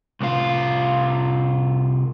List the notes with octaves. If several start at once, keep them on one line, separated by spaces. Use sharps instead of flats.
C2 F4